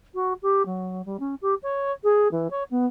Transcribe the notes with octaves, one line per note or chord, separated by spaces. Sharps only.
F#4
G4
F#3
G3
C#4
G4
C#5
G#4
E3
C#5
B3